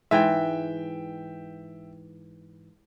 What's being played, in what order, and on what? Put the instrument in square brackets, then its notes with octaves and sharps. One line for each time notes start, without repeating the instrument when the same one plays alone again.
[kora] G#2 E3 [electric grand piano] E5 G5